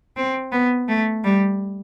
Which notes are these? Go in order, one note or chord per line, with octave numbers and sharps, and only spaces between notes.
C4
B3
A3
G3